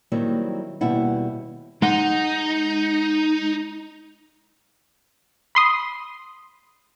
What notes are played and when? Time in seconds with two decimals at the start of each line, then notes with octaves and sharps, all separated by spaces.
0.12 D#3 F#3 G3 A#3 C4 E4
0.81 D#2 B2 G3 E4 F#5
1.82 G#3 D#4 F#5
5.55 B5 C6 D#6